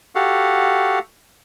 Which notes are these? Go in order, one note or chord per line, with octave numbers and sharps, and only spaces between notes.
F#4 G4 A4 F5 F#5